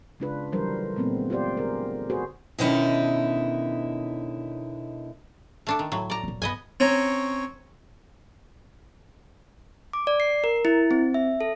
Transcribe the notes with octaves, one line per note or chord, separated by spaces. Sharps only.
C#3 G#3 D4 F4 B4
D3 E3 F#3 G3 A#4 C5
A#2 G#3 A3 B3 C4
F4 G4 C5 D5
D3 G#4 A#4
F#4 G#4 B4 C5
B2 D3 D#3 C#4 D#4 E4
A3 D4 A4
D#3
A2 F#3
D5 A#5
D#1 D#2
G2 B3 D#5 G#5
C4 C#4 C#5 A#5
D6
D5
C7
A#4
E4
C4
E5
A4